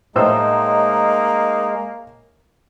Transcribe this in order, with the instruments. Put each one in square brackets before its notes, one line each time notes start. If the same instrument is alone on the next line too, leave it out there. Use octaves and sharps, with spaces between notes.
[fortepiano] A2 C5 E6 [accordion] G#3 [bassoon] A#3 [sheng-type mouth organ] D#4